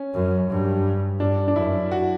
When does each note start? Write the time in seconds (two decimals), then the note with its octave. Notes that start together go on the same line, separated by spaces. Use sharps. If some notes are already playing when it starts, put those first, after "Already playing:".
Already playing: C#4
0.14 F#2
0.50 G2
1.20 G2 D4
1.48 D4
1.56 F#2 E4
1.91 F#4